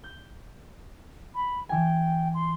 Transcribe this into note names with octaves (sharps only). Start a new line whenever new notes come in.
G6
B5
E3 G5 G#5
C6